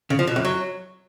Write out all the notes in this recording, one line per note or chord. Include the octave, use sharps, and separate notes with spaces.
C#3
F3
B2
F#2
F#3